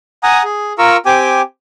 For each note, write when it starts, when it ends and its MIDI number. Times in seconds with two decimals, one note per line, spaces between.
0.23 0.43 78
0.23 0.43 80
0.23 0.43 82
0.23 0.43 87
0.44 0.73 68
0.78 0.97 65
0.78 0.97 70
0.78 0.97 82
0.78 0.97 85
0.78 0.97 88
1.06 1.41 60
1.06 1.41 67
1.06 1.41 79
1.06 1.41 80
1.06 1.41 86